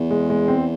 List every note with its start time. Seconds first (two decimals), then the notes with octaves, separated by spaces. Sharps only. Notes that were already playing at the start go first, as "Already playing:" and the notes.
Already playing: E2
0.11 G#3
0.30 G#3
0.48 C4